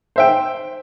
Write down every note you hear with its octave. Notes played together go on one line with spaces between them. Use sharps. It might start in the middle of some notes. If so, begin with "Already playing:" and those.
C5 E5 G5